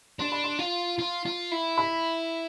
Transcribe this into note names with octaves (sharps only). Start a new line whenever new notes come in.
D4 C6
B5
C6
F4
F4
F4
E4
B5